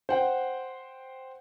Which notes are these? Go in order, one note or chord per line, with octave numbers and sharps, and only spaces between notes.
C5 F#5 G5